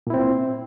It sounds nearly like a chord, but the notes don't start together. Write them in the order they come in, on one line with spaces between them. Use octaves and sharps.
A#2 E4 C4